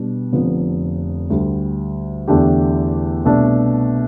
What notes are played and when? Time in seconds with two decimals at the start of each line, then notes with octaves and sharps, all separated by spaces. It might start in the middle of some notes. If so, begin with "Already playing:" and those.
Already playing: B2 G3 D4
0.33 F1 F2 D3 F3 B3
1.30 D2 D3 G3
2.28 E2 D3 A3 D4 G4
3.24 C2 B2 A3 D4